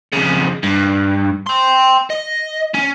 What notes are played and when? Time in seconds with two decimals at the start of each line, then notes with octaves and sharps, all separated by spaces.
0.13 F2 C#3
0.63 G2
1.47 G5 C6
2.10 D#5
2.74 C#4